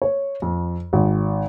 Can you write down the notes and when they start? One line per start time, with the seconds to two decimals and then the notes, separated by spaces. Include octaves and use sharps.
0.02 C#5
0.42 F2
0.93 G#1